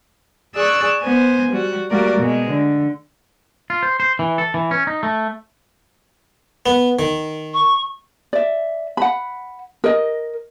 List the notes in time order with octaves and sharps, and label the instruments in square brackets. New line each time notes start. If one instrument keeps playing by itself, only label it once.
[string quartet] G#4 D5 C#6 E6 F#6
B3 C5 G#5
G3 F#4
G3 A3 A#3 F#4 A#4 D5
B2 G#3
D3
[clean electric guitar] F4
C5
C5
E3
A4
E3
C#4
D#4
A3
[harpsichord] B3
D#3
[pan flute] C#6
[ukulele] D5 E5
F#5 B5
A#4 D#5